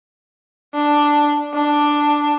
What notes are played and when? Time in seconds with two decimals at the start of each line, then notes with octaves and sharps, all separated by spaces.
0.74 D4
1.54 D4